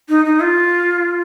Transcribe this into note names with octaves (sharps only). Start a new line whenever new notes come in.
D#4
D#4
F4